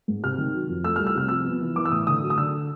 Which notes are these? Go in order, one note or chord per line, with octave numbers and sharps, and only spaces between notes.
G#2
C3 F6
D#3
F#3
F2
A3 E6
C2 F6
E6
C3 F6
F3 E6
B3
E3
E3 D6
E6
A2 D#6
D3 D#6
F#3
D#6
D3 E6